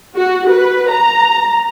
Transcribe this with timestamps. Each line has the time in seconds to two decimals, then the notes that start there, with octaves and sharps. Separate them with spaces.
0.17 F#4
0.50 B4
0.92 A#5